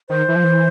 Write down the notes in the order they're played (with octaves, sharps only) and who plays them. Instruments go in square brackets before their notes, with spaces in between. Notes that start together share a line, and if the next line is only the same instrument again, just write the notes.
[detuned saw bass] D#3 [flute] C5
[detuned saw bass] E3
F3
E3